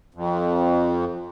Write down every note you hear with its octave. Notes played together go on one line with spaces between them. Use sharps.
F2